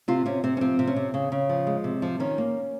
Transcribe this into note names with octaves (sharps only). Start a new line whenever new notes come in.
C3 F4
C3 C#4
C3 C4
C#4
F3 C4
C3
C#4
C3
C#3
C#3
F3
G#3
C3
F3
D#3 C#4
A#3